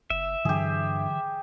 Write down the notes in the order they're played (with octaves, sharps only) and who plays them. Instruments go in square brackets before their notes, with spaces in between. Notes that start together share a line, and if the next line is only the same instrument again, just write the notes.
[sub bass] F#1 [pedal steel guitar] E5
[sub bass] G2 [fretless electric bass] D3 E3 F#3 [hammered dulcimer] G4 G#4